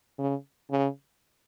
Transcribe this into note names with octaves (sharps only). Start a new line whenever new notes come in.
C#3
C#3